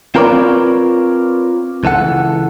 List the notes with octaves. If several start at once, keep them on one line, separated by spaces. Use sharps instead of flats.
C4 F4 A#4 B4 C#5 D5
C#2 E3 A4 F#5